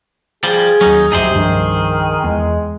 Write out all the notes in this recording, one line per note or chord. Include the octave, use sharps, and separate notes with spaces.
F3 G3 G#4
D#2 F#3 C#4 D#4
F1 C2 F#2 C3 D#4 G#4 C5
C2 G2 D#3 F3
E2 G#3